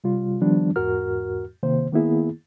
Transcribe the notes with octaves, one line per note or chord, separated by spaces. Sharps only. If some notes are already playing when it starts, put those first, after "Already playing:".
C3 G3 F4
D#3 F3 G3 B3 D4
E2 G#2 F#4 A#4 F6
C3 D#3 A#3 C5
D#3 A#3 B3 E4 G#4